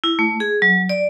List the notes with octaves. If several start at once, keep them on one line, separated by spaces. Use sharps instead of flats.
E4
A3
G#4
F#3
D5